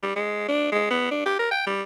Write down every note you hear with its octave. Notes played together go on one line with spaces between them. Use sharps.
G3
G#3
D4
G#3
B3
D4
G4
A#4
G5
G3